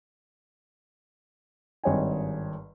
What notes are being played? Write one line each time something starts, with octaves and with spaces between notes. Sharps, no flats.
G#1 G2 C#5 D#5 G5 G#5